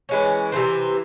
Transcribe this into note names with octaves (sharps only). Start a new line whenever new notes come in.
E3 G#3 C#4
C3 E3 A3 C4